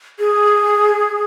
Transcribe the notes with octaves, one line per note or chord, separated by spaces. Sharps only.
G#4